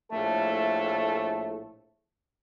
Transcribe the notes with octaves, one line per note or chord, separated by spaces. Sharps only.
A#1 A2 A3 A4